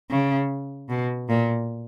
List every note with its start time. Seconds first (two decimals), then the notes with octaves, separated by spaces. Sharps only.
0.10 C#3
0.89 B2
1.29 A#2